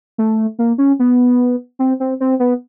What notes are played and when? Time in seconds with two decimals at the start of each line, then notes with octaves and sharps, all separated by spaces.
0.18 A3
0.59 A#3
0.78 C#4
0.99 B3
1.79 C4
2.00 C4
2.20 C4
2.40 B3